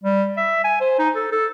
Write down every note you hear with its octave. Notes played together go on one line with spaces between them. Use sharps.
G3
E5
G#5
C5
D#4
A4
A4